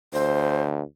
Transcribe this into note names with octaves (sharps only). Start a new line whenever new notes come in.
D2 C5